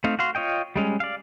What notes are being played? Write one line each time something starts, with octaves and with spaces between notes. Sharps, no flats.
A3 C4 D#4 F5
F#4 F5 C6
F4 C#5 D#5 G5
G3 G#3 C#4
D5 F5